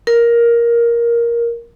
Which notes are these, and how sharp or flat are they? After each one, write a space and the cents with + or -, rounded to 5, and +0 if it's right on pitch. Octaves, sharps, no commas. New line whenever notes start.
A#4 +10